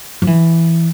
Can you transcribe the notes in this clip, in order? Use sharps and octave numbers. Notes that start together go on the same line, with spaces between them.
F3
E3